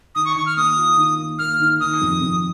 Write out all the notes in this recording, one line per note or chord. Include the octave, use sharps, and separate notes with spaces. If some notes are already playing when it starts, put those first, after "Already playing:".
D#3 D#6
C#6
D#3 C#6
F6
A#3 D#6
F4
D#3
A#3
A#3 F6
D#3
D#3 D#6
F2
F2